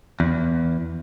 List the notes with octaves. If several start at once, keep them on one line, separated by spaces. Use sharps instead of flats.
E2